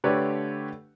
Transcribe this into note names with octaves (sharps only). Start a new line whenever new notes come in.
D3 A3 G4 B4 C#5 D5